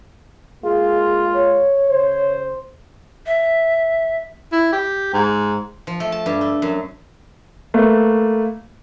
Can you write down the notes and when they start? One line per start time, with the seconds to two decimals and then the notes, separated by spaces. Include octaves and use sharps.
0.64 G#3 A#3 F4 G#4
1.34 C#5
1.89 C#3 C5
3.26 E5
4.52 E4
4.73 G4
5.14 G#2
5.87 F3
6.00 A3
6.12 A5
6.26 G2
6.41 A3
6.62 F#2
7.74 A3 A#3 B4